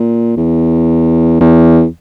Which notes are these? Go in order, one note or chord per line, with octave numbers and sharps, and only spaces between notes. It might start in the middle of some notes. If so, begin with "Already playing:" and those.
Already playing: A#2
E2
E2